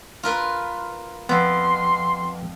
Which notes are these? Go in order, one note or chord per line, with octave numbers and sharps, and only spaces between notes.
F4 A#4 B4
F2 B3 C6